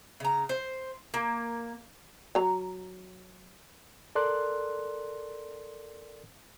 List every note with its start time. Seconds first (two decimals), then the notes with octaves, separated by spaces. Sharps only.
0.20 C#3 A#5
0.49 C5
1.14 A#3
2.35 F#3 A#5
4.15 A4 A#4 D5 C6 F#6